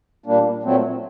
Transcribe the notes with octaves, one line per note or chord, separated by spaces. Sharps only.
A#2 G3 A#3 D4
A#2 F#3 A3 C4